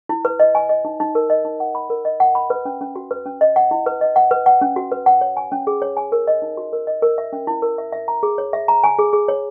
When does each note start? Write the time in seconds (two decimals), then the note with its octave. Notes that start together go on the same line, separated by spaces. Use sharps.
0.09 E4
0.25 B4
0.40 D#5
0.55 G#5
0.69 D#5
0.85 D#4
1.00 D#4
1.15 A#4
1.30 D#5
1.45 D#4
1.60 F#5
1.75 B5
1.90 A#4
2.05 D#5
2.20 F#5
2.35 B5
2.50 B4
2.65 C#4
2.81 C#4
2.96 F#4
3.11 B4
3.26 C#4
3.41 D#5
3.56 F#5
3.71 E4
3.86 B4
4.01 D#5
4.16 F#5
4.31 B4
4.46 F#5
4.61 C#4
4.76 F#4
4.92 B4
5.06 F#5
5.21 C#5
5.37 G#5
5.52 C#4
5.67 G#4
5.82 C#5
5.97 G#5
6.12 A#4
6.27 D#5
6.42 D#4
6.57 F#4
6.73 A#4
6.87 D#5
7.02 A#4
7.18 E5
7.33 C#4
7.47 E4
7.62 A#4
7.78 E5
7.93 E5
8.08 A#5
8.23 G#4
8.38 C#5
8.53 E5
8.68 A#5
8.84 G#5
8.99 G#4
9.13 G#4
9.28 C#5